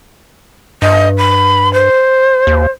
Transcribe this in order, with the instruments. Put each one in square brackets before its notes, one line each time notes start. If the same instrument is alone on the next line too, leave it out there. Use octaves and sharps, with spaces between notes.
[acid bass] G2 [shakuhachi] D#5
[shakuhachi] B5
C5
[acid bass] D#2